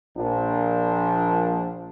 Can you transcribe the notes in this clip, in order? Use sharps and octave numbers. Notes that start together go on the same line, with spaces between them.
A#1 A#2 F3 D4